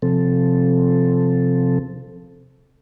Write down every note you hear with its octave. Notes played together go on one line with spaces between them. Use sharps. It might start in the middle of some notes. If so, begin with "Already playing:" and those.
C3 F3 C4 A4